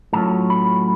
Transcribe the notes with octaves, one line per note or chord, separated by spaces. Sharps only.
A2 F#3 C#4 F4 A5
B5